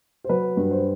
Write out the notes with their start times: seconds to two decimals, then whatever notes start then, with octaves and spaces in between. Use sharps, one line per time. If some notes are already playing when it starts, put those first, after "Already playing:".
0.24 C5
0.29 F#3 B4
0.57 G2
0.71 C5